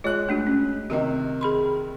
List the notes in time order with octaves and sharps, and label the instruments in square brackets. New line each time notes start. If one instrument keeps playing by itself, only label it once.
[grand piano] G#3 F#6 [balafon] F4 C#5
[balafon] A3 D4 F#4
C#4
[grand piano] C3 D#3 [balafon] F#4 D#5
[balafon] G#4 B5 C6